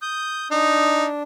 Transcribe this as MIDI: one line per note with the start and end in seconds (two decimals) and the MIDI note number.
0.02 0.48 87
0.02 0.48 91
0.51 1.23 62
0.51 1.05 63